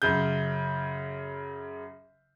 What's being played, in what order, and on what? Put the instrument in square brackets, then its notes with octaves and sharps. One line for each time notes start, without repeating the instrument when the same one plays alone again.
[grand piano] F#2 C#3 G6